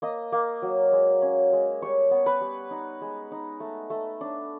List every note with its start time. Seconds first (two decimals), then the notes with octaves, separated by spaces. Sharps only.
0.02 A#3 D#5
0.32 A#3
0.62 F#3
0.93 G#3
1.22 C#4
1.52 G#3
1.82 G3 C#5
2.11 B3
2.26 B4
2.41 G3
2.71 D#4
3.01 G#3
3.32 D#4
3.60 A3
3.90 A3
4.21 D4